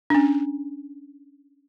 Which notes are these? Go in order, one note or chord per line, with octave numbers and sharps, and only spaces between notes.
C#4 D4